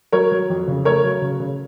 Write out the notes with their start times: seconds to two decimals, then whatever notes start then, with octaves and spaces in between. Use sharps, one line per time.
0.12 F#3 A#4 C#5
0.32 F#3
0.50 F2
0.67 C#3
0.85 A3 A#4 C#5
1.03 F#3
1.21 C#3
1.40 C#3